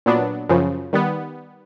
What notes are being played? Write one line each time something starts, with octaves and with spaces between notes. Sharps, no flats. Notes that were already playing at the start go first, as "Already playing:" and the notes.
A#2 F#3 B3 D4
F#2 C#3 F3
D#3 G3 B3